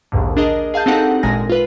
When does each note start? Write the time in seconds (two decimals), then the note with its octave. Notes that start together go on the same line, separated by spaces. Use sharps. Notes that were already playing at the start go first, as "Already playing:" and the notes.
0.12 A#1 D#2 G#2 D3
0.37 D4 G#4 A#4 D#5
0.74 G#4 F5 A5 G6
0.86 C4 D4 D#4 G4 A4 F#5
1.23 G#1 A#2 G#3 G#5 A#6
1.50 F4 B4